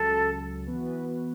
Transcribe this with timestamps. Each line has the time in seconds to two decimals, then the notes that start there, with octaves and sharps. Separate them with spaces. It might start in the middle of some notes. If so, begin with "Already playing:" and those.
Already playing: C#2 C#3 F#3 A4
0.66 E3 B3 F#4 B4